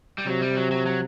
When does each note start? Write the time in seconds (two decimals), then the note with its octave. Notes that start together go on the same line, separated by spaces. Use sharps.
0.18 G3
0.27 C3 F#3
0.42 G3
0.56 F#3
0.71 F#3
0.86 F#3